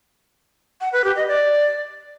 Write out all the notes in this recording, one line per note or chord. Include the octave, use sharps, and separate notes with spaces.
F#5
B4
G4
D#5
D5